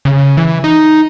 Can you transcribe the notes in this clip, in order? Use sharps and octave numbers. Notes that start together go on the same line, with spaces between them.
C#3
E3
D#4